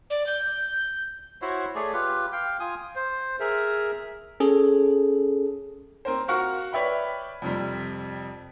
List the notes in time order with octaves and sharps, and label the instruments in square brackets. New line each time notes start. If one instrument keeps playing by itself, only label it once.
[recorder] D5
G6
[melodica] E4 F#4 C5 C#5
A3 G#4 C#5 D5
F4 G4 B4
F5 G5
F4 G#5 D#6
C5
G#4 A#4 E5
[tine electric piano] C#4 G#4 A4
[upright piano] C4 A#4 C5
F#4 A#4 F5 F#5 C#6 F6
B4 C#5 D5 E5 G5 B5
F2 C3 G3